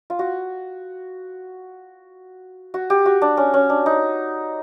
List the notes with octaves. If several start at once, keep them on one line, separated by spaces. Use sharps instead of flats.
F4
F#4
F#4
G4
F#4
D4
C#4
C#4
D4
D#4